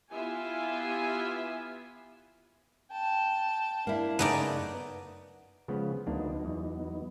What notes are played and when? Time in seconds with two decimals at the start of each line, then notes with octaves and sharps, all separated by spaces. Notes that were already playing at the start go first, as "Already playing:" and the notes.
0.13 B3 E4 F4 G4 E5 G#5
2.92 G5 A5
3.87 A#3 D4 E4
4.19 F#2 C#3 A3 B3 D#4 D5
5.68 C#3 F3 G#3 B3
6.07 D2 F#3 A#3 B3 D4 D#4
6.45 E2